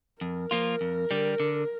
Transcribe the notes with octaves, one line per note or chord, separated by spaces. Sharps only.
F2 A#4
F3 A#3 F4
F2
D3 G3
D3